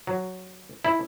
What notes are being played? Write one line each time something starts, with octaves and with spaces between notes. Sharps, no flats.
F#3
E4